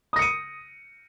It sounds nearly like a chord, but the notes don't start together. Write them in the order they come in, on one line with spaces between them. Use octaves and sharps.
D#6 A#6 C#7 D#7